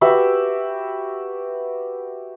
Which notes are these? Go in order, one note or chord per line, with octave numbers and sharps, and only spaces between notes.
F#4 G4 B4 E5